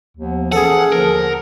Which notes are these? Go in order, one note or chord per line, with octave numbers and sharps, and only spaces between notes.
D#2 F3 B3
E3 C#4 G#4 A4 F#5
D#2 D3 F3 A#4